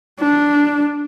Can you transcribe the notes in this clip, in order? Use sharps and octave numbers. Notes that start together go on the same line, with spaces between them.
D4